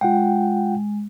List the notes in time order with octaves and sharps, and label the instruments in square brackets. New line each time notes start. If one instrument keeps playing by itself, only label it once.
[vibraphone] G#3 [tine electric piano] F4 F#5 G5